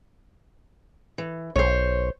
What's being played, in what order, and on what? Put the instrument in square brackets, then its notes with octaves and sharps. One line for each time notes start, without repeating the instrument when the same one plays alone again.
[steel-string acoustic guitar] E3
[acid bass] B1 [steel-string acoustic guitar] C5 C#5